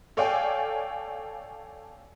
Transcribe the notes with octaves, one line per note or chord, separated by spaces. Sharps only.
A4 C#5 D5 F5 G5 G#5